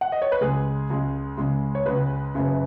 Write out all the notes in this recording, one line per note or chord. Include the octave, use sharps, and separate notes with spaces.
F#5
D#5
C#5
B4
C#2 C#3 G#3 G#4
C#2 C#3 G#3
C#2 C#3 G#3
C#5
C#2 C#3 G#3 B4
F#1 F#2 C#3